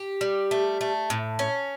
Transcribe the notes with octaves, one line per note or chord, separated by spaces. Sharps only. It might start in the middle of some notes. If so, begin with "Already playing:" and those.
Already playing: G4
G3
A3
A3
A2
C#4